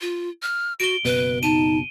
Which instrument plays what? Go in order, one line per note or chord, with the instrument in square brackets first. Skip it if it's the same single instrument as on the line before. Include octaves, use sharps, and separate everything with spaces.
[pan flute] F4
F6
[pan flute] F#4 [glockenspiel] D7 G7
[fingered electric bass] F#1 B2 [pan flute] B4
[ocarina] D#4 [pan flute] A5 [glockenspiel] D#7